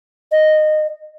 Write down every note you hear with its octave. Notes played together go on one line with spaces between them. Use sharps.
D#5